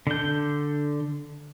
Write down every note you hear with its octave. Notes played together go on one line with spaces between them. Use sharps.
D3 G6